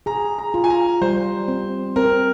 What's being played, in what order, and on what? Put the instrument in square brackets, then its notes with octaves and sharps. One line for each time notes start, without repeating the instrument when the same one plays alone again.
[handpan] G#4 [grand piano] A#5
[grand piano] A#5
[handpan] F4
[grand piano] G#5
A#5
[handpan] G3 [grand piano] C5
[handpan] C4
[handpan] C4 [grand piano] A#4